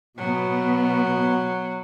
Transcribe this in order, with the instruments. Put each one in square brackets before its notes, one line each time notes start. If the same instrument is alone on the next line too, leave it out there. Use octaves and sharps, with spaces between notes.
[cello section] B2 B3 [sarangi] F#3